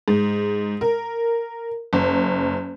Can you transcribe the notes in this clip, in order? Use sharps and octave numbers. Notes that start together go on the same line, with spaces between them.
G#2
A#4
F#1